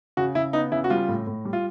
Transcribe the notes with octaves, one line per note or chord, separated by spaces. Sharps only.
C#3 F#4
C#3 E4
B3 D#4
C#3 E4
F#4
G3 F4
A2
A2
G3
F4